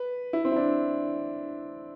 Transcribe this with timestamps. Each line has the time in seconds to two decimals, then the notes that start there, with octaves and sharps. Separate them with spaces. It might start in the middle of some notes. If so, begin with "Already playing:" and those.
Already playing: B4
0.33 E4
0.45 C4
0.52 E4
0.56 D4